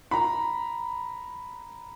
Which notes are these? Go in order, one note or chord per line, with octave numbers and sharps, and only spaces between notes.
A#5 B5